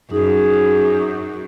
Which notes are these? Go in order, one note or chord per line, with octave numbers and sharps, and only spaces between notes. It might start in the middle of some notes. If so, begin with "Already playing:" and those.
F#2 D#4 G#4